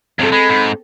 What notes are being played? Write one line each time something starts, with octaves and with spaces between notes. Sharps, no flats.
F2 C3 C4 A4
G#3 B5
G#2